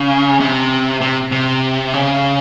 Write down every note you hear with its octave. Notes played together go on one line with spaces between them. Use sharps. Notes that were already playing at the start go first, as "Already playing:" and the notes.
Already playing: C#3
C3
C3
C3
C#3